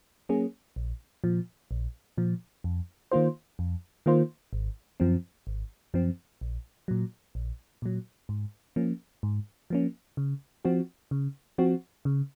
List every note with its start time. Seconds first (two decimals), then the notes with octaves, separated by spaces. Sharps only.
0.29 F#3 A#3 C#4 G#4
0.76 A#1
1.24 A#2 F3
1.71 A#1
2.18 A#2 F3
2.64 F2
3.12 D#3 A#3 F4 C5
3.59 F2
4.06 D#3 A#3 F4 C5
4.53 G#1
5.00 F#2 F3 C4
5.47 G#1
5.94 F#2 F3 C4
6.41 A#1
6.88 A#2 F#3
7.35 A#1
7.82 A#2 F#3
8.29 G#2
8.76 F3 A#3 C#4
9.23 G#2
9.70 F3 A#3 C#4
10.17 C#3
10.65 F3 C4 F#4
11.11 C#3
11.58 F3 C4 F#4
12.05 C#3